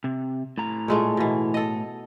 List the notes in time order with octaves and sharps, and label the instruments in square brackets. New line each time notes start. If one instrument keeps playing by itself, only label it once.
[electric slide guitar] C3
A2 A#5
[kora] A#2 G#3 A3
B2 E3
A4 D#5